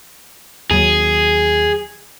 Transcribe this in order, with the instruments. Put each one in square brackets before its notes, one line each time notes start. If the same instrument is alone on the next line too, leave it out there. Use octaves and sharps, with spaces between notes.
[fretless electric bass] D#2 F#3 [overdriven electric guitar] G#4